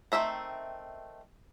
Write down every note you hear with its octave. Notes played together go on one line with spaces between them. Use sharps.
D#3 A3 C4 E5 A#5